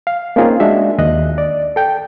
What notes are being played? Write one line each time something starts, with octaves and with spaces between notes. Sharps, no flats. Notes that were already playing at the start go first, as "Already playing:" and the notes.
F5
A#3 C4 C#4 D#4 F4 G#4
G#3 D4 F#4 E5
D#2 D#5 F#6
D5
A4 G5 G6